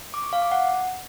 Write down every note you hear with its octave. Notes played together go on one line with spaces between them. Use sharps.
D6
C#6
F5
D6
F#5